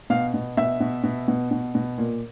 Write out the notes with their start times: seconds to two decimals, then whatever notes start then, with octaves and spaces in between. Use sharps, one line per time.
0.10 B2 F5
0.34 B2
0.57 B2 E5
0.80 B2
1.04 B2
1.28 B2
1.51 B2
1.75 B2
1.98 A#2